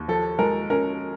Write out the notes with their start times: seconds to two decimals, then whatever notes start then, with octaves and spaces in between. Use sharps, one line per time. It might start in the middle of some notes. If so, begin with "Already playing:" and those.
Already playing: D#2
0.08 F3 A4
0.39 G#3 A#4
0.70 C#4 A#4